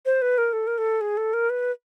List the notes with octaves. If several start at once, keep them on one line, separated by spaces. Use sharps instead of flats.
C5
B4
A#4
A4
A#4
A4
G#4
A4
A#4
B4